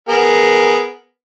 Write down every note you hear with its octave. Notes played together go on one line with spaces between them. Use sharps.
B3 G#4 A#4